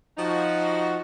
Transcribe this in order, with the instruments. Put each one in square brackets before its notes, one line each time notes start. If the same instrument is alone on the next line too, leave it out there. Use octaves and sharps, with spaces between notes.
[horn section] F3 D#4 F#4